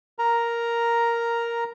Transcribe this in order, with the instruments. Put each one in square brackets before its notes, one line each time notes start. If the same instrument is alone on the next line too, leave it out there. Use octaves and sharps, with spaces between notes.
[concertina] A#4 A#5